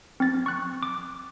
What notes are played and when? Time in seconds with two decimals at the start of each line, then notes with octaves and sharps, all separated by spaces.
0.20 C4 A6
0.46 C#6 F#6
0.83 D6